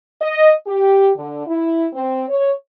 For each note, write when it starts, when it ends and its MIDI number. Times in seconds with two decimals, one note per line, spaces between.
0.21 0.51 75
0.67 1.11 67
1.16 1.45 50
1.47 1.86 64
1.93 2.23 60
2.28 2.52 73